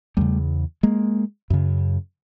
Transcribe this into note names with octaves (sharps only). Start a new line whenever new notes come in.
E2 C#3 G3 A3
G#3 A#3
F#2 C#3